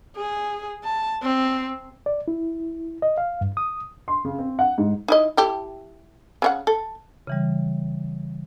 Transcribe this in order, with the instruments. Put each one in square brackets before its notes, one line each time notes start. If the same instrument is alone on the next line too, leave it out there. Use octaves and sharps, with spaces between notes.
[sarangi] G#4
A5
C4
[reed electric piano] D5
E4
D#5
F5
G2
D#6
[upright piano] C6
C#3
C4
F#5
G#2
[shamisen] D#4 E4 D#5
E4 G4 A4
C#3 C#4 F#5
A4
[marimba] C#3 E3 G3